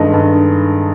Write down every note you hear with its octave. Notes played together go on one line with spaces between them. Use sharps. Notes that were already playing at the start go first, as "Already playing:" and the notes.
Already playing: G2 D#3 G#3 A4 D#5
G2